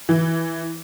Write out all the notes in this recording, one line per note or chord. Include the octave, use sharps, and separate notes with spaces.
E3